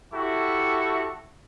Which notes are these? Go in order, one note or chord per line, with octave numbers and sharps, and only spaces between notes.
E4 F#4 G4 A4 E5 C#6